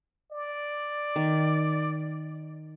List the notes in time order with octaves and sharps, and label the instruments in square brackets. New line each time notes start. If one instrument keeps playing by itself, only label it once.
[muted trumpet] D5
[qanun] D#3